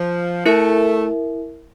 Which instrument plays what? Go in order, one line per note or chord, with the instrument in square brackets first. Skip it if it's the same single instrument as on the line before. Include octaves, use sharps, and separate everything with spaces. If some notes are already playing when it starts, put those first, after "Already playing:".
Already playing: [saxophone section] F3
[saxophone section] A3 [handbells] E4 A#4 E5